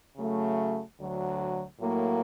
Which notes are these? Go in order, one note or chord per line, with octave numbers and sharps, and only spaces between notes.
C#3 F#3 A3
D2 D3 F#3
A2 F#3 A#3